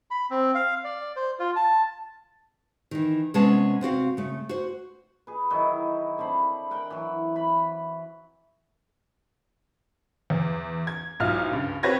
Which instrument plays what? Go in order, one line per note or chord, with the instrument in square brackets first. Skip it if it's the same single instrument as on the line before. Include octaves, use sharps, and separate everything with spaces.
[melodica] B5
C4
F5
D5
C5
F4
A5
[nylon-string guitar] D#3 E3
C3 G#3 B3 C#4 F#5 A5
C3 C4 F#4 F5
C#3 A3
F#4 C5
[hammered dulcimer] G#4 B4
D#3 F#3 D#4 E4
D3 C4 A5 B5
A#4 F#5 G5
E3 F#3
B5
[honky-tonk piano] E2
G#6
B1 G#2 E4 F4 F6
C#2 G2
C4 G4 B4 C#5 G#6 A#6